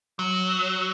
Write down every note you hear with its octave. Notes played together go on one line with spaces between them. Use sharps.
F#3